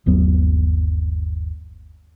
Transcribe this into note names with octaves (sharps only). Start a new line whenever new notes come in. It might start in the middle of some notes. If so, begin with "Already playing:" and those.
G1 D#2 F#3 B3